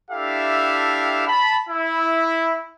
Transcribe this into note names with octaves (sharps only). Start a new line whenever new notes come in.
D4 E4 G4 A4 E5 F5
A5 B5
E4